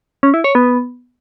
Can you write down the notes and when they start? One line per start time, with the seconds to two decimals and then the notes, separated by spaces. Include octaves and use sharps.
0.23 C#4
0.34 E4
0.44 C#5
0.55 B3